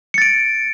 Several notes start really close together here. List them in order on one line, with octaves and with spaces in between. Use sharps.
C#7 A6 D7